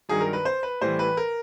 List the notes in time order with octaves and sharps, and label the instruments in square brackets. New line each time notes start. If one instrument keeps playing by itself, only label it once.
[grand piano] G2 D#3 F#3 G#4
A#4
B4
C5
B4
A2 E3 G3 C5
B4
A#4